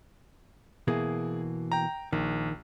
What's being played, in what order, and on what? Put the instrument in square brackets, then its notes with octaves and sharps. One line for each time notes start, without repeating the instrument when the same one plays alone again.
[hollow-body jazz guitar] B2 E3 A#3 [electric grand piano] G#4
[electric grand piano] G5 A#5
[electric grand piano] A#1 [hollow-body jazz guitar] D#3